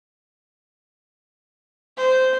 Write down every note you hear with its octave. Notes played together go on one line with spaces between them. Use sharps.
C5